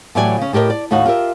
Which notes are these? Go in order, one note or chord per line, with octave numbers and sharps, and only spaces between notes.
A2 E3 F#3 G4 D5 G#5
C#3 C#4
A2 G4 A#4 C5 D#5
D5
D#2 A2 D#4 F#4 F5 F#5
F4 G4 A#4 E5